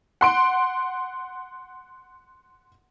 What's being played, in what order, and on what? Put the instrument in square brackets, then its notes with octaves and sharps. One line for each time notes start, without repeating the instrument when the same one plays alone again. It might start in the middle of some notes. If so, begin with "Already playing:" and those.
[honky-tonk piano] F#5 C6 D7